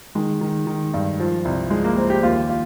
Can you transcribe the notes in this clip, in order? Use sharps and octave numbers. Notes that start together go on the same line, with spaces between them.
D#3 G#3
D#3
D#3
G2
F3
C2
F3 G#3
A#3
F3 C4
G4
D#2 F4
F4